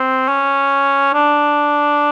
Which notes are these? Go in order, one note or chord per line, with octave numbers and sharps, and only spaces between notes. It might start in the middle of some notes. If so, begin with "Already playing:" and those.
Already playing: C4
C#4
D4